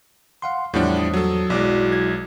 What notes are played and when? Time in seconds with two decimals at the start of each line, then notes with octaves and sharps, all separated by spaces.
0.42 F5 F#5 C6
0.74 E2 A2 F3 G3 D4 C#5 F#5
0.97 D#6
1.14 F#3 A4
1.50 B1 F#3 G#3 E4 F#4 D5 D6
1.92 G#6